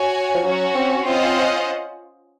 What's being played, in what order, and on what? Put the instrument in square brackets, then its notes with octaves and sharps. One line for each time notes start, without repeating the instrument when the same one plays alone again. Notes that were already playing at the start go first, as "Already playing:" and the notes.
Already playing: [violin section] F#4 C#5 G#5
[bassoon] F3
[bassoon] F#3 [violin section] C#4 F#4 C#5
[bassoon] C4
[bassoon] C4 [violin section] C#4 F4 C5 D#5 F#5